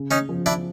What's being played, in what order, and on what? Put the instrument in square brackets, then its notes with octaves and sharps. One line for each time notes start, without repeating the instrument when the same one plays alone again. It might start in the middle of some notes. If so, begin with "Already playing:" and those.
Already playing: [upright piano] C#3
[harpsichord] C#4 D#4
[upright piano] F3
[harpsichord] D4 E4